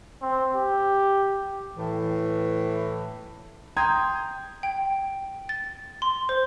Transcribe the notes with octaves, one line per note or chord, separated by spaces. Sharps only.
C4
G4
A2 E3
G5 A#5 C6 D#6 G6 G#6
G5
A6
C6
C5